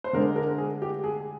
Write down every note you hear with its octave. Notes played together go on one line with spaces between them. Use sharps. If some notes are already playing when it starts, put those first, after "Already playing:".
C5
D3 G#3 D4 A#4
A#4
G#4
G4
G#4